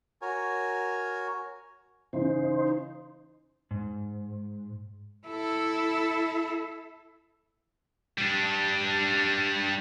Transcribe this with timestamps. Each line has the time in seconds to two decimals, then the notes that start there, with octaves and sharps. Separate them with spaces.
0.22 F#4 A#4 C#5 G#5
2.13 C#3 E3 D#4 C5
3.71 G#2
5.27 E4 A4
8.18 G3 D4